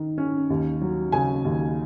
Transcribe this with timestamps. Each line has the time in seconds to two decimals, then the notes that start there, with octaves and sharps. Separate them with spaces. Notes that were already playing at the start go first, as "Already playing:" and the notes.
Already playing: D#3
0.18 C#4
0.50 D#2
0.81 F#3
1.12 C#3 G#5
1.45 D#2